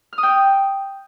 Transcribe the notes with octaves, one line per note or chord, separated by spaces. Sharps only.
F6
D#6
G5